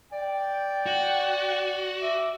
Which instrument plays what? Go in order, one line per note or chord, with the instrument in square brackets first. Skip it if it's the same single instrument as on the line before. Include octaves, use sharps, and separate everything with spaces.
[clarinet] D5 [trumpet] G5
[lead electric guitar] F#4
[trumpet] E5 [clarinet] D6